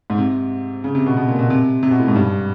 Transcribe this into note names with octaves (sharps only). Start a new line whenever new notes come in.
G#2
C3
C#3
C3
B2
B2
A#2
B2
C3
C3
B2
A2
G#2
G2